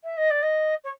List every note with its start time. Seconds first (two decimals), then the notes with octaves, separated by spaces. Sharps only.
0.04 E5
0.17 D#5
0.30 D5
0.42 D#5
0.84 C#5